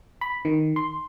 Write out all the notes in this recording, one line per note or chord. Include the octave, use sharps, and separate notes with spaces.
B5
D#3
C6